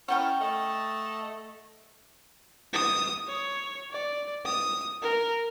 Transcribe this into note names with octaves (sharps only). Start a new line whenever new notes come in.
C#4 E4 A#4 F#5 G5 A5 D#6
A3 D#5 A5
D#6
C#5
D5
D#6
A#4